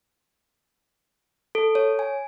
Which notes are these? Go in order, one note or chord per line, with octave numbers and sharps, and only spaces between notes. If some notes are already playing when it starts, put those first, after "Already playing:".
A4
C#5
G#5